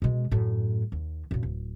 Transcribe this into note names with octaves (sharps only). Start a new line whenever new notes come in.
B2 G#3
F#2 A2
D#2
F#2 A#2
D1